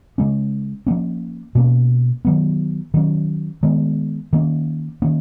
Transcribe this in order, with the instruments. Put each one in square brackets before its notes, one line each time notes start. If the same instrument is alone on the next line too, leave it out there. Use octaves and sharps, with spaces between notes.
[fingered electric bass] C#3 G#3 C#4
F3 A#3 C#4
B2 A#3 C#4
D#3 F#3 B3
D#3 F#3 C#4
D#3 G#3 B3
D#3 A#3 C#4
D#3 A#3 C#4